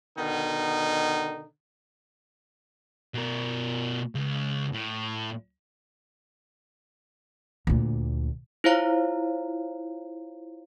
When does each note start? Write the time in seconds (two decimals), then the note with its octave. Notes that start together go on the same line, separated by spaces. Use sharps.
0.18 B2 D3 D#3 D#4
3.14 B2 A#4
4.15 C#2
4.73 A2
7.67 D2 A#2
8.64 E4 F4 C5 C#5 F5 A#5